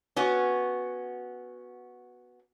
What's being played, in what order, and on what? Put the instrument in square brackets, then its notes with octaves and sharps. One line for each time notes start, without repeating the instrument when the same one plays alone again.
[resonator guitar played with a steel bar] B3 C#4 F#4